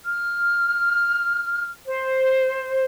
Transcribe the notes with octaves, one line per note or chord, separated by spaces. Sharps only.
F6
C5